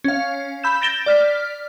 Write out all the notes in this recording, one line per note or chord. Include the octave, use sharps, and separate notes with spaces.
C#4 F5
B5 E6 G6 E7
G6 A6 A#6 D7 E7 G7
D5 F6 B6